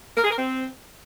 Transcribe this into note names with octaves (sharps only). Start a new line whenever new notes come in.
A#4
G#4
A#4
C4